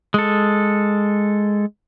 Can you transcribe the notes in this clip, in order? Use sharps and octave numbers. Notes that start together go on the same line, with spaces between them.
G#3 A4